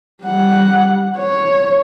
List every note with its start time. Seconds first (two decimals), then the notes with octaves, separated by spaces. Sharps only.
0.23 G3 F#5
1.18 C#5